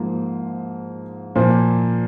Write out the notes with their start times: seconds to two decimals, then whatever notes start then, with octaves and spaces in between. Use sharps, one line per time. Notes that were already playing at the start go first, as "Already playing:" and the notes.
Already playing: G#2 F3 A#3 F4
1.35 A#2 F3 A#3